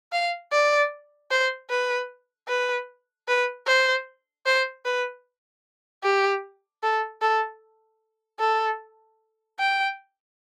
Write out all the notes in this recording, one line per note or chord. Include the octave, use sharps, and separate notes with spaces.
F5
D5
C5
B4
B4
B4
C5
C5
B4
G4
A4
A4
A4
G5